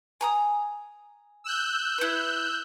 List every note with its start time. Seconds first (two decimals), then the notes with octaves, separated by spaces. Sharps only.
0.21 G#5 A#5 D#6
1.44 E6 F#6 G6
1.98 E4 B4